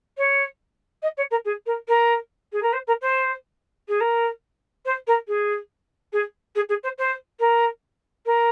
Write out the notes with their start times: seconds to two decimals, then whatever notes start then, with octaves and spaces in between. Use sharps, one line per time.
0.17 C#5
1.02 D#5
1.17 C#5
1.31 A#4
1.45 G#4
1.66 A#4
1.88 A#4
2.52 G#4
2.62 A#4
2.73 C5
2.87 A#4
3.01 C5
3.88 G#4
4.00 A#4
4.85 C5
5.07 A#4
5.28 G#4
6.12 G#4
6.55 G#4
6.69 G#4
6.83 C5
6.98 C5
7.40 A#4
8.26 A#4